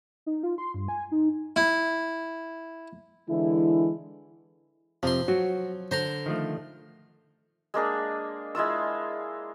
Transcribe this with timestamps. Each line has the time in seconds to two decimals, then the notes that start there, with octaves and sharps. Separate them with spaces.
0.26 D#4
0.43 F4
0.58 C6
0.74 G2
0.88 G#5
1.12 D#4
1.56 E4
3.29 D3 E3 G#3 E4
5.03 F2 C3 F3 C6
5.28 F#3 F#4
5.91 D3 C5 A#5 C6
6.26 D#3 F3 A3
7.74 G#3 A#3 D4 G#4
8.55 G#3 E4 F4 E6